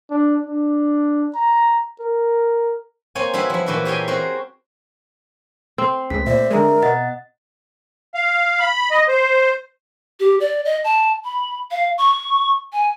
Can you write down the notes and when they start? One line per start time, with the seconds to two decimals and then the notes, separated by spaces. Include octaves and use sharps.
0.11 D4
0.47 D4
1.35 A#5
2.00 A#4
3.15 A#3 C4 C#5 G#5
3.34 G3 B3 E4 E5 F5 B5
3.50 F3 E4
3.66 A#2 E3 F#4 G4 E5
3.85 G4 G#4 A#4 C#5 G5 G#5
4.08 C4 F#4 A#4 C5
5.78 C4 C6
6.10 C#2 A3 B6
6.27 A#2 C5 D5 E5
6.50 D3 G#3 A#4 E5 A#5
6.82 B2 D#5 F#5 A6
8.15 F5
8.60 B5
8.91 D#5
9.08 C5
10.20 G4
10.40 D5
10.65 D#5
10.84 A5
11.25 B5
11.71 F5
11.98 C#6
12.73 G#5